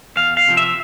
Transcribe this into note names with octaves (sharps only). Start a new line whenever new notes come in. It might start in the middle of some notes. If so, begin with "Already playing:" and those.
E2 F5
F5
C3 F3 C4
E5